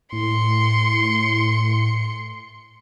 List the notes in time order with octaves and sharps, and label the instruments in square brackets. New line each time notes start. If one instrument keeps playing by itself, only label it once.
[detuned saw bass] A2 [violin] C6 C#7